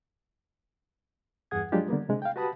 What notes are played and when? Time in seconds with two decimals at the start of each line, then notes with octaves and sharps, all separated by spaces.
1.51 E2 G2 G#4 F#5 D#6 G#6
1.72 F3 F#3 G#3 D4 F4 G4
1.89 D3 G3 A#3 B3
2.09 C3 G#3 D4
2.22 F5 G5
2.36 F#4 G4 B4 A5 B5 D#6